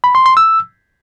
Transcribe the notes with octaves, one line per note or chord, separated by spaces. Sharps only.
B5
C6
C6
E6